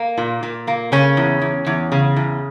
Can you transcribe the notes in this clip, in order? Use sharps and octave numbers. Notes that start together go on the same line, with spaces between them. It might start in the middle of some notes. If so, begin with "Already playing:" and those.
Already playing: A#3
A#2
A#2
A#3
C#3 C#4
E2
E2
E2
C#3
E2